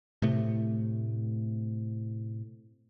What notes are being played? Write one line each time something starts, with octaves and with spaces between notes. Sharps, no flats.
A2 C3 A3